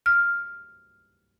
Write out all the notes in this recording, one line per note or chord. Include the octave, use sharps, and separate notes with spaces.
F6